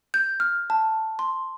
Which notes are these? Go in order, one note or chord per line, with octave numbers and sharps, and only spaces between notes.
G6
F6
A5
C6